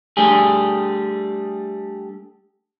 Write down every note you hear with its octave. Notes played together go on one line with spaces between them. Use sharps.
G3 A3 D4 G4 G#4